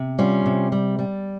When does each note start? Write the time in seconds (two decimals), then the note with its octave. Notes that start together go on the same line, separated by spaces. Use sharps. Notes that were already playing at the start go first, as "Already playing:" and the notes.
Already playing: C3
0.19 G3 C#4 F4
0.46 C3
0.72 G3
0.99 G3